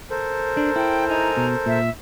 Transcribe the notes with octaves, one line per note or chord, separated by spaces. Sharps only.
A4 A#4 C5
D4
E4 G5
D#4 G#5 A#5
B2
A#2 E5